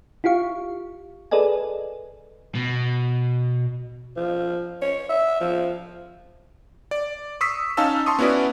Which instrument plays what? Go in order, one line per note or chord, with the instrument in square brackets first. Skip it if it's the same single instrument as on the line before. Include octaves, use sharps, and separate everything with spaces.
[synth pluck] E4 F4 G4 F5 C#6
G#4 A4 B4 D5 D#5 G#5
[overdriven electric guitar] B2
[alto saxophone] F3
C#5
E5
F3
[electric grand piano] D5
C#6 D#6 E6 B6 C7
C#4 D#4 F5 A5 E6 E7
A5 C6 C#6 D#6
B3 C#4 E4 F#4 B4 D5